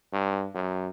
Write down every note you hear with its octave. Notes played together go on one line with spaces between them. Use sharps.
G2
F#2